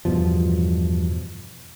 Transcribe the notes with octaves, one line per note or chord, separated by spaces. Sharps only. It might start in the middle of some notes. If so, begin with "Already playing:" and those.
E2 G2 B2 F3